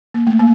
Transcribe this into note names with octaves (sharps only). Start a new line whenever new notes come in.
A#3
A3
A#3